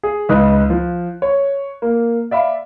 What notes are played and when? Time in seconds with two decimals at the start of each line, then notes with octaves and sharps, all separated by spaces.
0.03 G#4
0.29 C#2 D#4 B4 D#5 D#6 F#6
0.70 F3
1.22 C#5
1.82 A#3
2.31 D5 E5 F5 B5